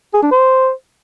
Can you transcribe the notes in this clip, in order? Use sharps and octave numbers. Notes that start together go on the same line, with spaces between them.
G#4
D4
C5